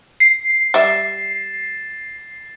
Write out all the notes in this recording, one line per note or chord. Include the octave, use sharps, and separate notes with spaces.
C7
G3 E5 A6 E7